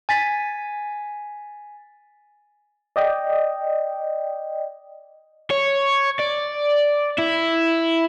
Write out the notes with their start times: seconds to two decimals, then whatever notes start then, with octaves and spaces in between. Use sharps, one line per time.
0.09 G#5 A6 B6
2.96 D5 D#5 G5
5.50 C#5
6.19 D5
7.18 E4